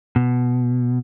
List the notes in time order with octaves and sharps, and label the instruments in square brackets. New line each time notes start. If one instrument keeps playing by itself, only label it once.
[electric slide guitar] B2